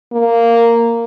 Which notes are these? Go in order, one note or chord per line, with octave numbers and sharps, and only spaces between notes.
A#3